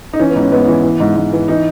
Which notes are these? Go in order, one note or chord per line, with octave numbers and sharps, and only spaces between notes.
D#4
E3 C#4
B3
G#2 C#4
G#2 B3
E3
E3
G#2
G#2
E3
E3 D#4